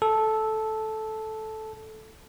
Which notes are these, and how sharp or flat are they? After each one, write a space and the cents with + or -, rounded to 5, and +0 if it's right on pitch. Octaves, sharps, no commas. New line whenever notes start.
A4 -10